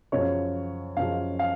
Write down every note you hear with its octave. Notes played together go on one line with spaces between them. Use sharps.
F#2 C#3 F3 C#5
F#2 C#3 F3 F5
F5